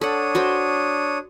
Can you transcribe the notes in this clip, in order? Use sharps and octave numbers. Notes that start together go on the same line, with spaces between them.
D4 A4 C#5 F#5 D#6
F#4 C5 G5